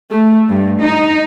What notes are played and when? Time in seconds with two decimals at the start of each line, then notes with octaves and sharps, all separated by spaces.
0.11 A3
0.49 G2
0.82 D#4